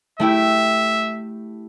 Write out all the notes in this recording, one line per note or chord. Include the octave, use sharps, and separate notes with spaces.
A3 E4 G4 E5